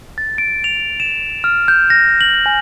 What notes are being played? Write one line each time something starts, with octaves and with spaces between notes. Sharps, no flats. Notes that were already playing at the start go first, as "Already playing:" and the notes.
A6
D7
F7
E7
F6
G6
A#6
F#7
G#5